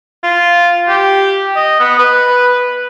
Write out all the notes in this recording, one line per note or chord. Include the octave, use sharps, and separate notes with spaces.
F4
G4
D#5
B3
B4